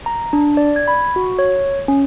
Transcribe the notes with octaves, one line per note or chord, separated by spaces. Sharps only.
A#5
D4
D5
G#6
B5
F#4
C#5
C#4